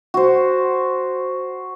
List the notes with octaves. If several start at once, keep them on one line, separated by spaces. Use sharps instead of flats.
F#4 C5